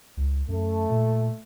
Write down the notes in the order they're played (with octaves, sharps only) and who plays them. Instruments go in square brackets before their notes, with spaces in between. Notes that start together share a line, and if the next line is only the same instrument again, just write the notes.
[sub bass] C#2
[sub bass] F#2 [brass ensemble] A3
[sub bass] A#2